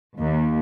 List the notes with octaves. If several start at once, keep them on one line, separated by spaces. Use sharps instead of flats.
D#2